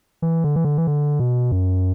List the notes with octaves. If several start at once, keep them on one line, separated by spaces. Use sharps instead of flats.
E3
D3
E3
D3
E3
D3
B2
F#2